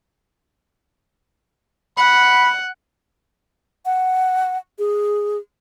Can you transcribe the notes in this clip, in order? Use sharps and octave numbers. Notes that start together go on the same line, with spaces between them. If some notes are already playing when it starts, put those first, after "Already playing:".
F#5 B5
F#5
G#4